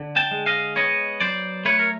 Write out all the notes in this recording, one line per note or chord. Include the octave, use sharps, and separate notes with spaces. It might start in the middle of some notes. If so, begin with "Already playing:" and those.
Already playing: D3
G5 A5
G#3
D#5 F5
B3 C#5 D#5
F#3 C5 D5
A3 B4 C#5
A#4